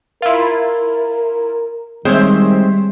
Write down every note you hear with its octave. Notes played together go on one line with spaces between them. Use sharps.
E4 F4 A#4
D#3 G3 G#3 C4 C5 C#5 E5